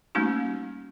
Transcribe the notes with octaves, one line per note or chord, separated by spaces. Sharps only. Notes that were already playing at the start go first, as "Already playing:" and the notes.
G3 A3 A#3 C#4 D#4 F#4